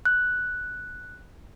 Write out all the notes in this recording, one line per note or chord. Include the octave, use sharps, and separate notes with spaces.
F#6